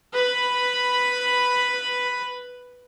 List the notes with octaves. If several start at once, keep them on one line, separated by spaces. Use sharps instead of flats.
B4 B5